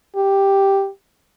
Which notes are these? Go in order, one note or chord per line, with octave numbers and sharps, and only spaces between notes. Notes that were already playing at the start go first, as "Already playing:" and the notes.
G4